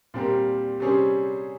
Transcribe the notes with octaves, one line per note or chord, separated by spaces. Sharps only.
A#2 G3 C4 G4 A#4
C3 G3 C#4 G#4 C5